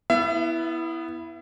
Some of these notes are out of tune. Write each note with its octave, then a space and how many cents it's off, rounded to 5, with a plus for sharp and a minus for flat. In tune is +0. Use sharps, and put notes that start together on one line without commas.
B3 -5 E4 +0 E5 +35